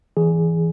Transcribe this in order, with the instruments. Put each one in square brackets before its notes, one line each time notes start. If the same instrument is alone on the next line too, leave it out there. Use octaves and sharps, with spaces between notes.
[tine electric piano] E3 G#4